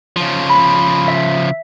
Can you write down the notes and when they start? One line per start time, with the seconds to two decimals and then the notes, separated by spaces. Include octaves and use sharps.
0.16 C#3 F3
0.50 B5
1.08 E5